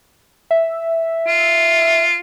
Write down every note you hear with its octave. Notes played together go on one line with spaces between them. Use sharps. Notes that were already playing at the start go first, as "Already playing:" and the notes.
E5
F4